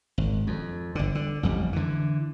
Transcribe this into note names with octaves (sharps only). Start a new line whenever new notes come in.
G#1
F2
G1 D3
D3
A1 F2 G3
D3 E3